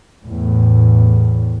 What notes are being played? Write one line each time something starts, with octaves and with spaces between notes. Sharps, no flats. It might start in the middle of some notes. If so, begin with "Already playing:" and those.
E2 A2